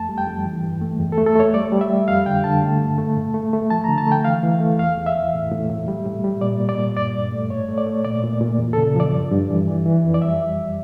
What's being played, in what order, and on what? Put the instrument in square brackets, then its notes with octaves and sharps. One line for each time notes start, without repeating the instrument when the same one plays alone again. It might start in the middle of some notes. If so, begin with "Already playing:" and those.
Already playing: [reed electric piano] F2 A3 A5
G3
G5
F2
E3
G2
A3
E2
A4
A3
A4
A3 C#5
G3 D5
G3
E5
G3
F2 F5
D3 G5
D3 A5
A3
G2
A3
A2
A3
A3
F3 A5
D3 A#5
A5
A3 G5
E3 F5
E3
A3
E2 F5
E2
E5
E3
A2
A2
A2
G3
A2
G3
A#2 D5
A#2
D5
A#2
G2 D5
G2
A3
A2 C#5
A3
D5
A3
A#2 D5
A#2
A#2
E2
C#3 A4
F3 D5
G2
G2
E3
E3
E3
F2
D5
G3 E5